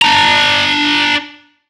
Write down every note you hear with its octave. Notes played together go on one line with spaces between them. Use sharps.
D4 A#5